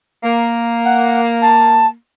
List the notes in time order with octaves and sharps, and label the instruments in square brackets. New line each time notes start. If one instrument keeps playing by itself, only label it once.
[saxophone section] A#3
[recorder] F#5
A5